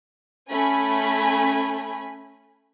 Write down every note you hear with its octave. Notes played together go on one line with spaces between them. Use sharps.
A3 C#4 G#5 B5